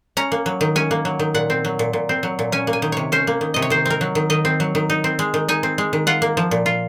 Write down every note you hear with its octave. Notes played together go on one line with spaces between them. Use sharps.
C#4 A#5
A#3
F#3
D#3
C#4 G#5
A#3
F#3
D#3
A#2 F#5
C4
F#3
A#2
A#2
C4
F#3
A#2
C#4 G#5
A#3
G#5
D#3
C3 C#5
C#4 C5
A#3
D#3
C3 D#5
C#5
D#3 C5
C4 A#4
F#3
D#3
D#3 D#5
C4
F#3
D#3
D#4
C4
G#3
D#3
D#4 G#5
C4
G#3
D#3
F4 F#5
A#3
F3
A#2
F4